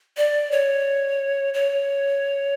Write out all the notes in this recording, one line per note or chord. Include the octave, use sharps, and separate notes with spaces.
D5
C#5
C#5